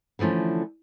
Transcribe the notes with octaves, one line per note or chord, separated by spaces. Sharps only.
D3 E3 F3 A3 C#4